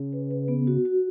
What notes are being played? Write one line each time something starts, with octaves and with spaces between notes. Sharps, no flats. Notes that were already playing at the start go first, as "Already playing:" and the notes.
Already playing: C#3
B4
B4
B3
F#4
F#4